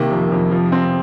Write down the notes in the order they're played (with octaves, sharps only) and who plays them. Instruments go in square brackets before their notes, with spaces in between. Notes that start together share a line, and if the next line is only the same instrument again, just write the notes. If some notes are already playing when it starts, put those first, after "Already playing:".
Already playing: [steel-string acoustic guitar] C3 [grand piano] D#3 A#3
[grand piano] F2
F2
F3
C4